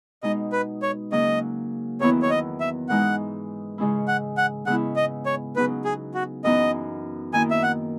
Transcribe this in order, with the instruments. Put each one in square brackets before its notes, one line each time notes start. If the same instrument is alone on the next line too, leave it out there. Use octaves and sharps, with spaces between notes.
[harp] B2 G#3 D#4 [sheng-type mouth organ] D#5
[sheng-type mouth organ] B4
C#5
[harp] C#3 F#3 A#3 C#4 [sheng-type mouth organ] D#5
[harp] E2 D#3 F#3 B3 E4 [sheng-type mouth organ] C#5
[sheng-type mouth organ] C#5
D#5
E5
[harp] G#2 E3 G#3 D#4 [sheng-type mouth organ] F#5
[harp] C#3 G#3 C#4 E4
[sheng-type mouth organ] F#5
F#5
[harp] C#3 G#3 B3 E4 [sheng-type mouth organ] F#5
[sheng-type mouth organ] D#5
C#5
[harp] C#3 F#3 B3 D#4 [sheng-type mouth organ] B4
[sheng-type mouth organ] G#4
F#4
[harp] F#2 E3 B3 D#4 [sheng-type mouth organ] D#5
[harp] D#3 A#3 E4 [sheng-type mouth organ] G#5
[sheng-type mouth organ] E5
F#5